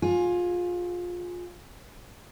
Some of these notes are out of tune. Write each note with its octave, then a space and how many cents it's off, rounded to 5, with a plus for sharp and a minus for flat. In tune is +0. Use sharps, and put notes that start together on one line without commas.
F4 +20 G#4 +0